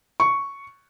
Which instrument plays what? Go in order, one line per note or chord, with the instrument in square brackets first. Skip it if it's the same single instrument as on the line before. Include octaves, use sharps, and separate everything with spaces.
[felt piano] C#6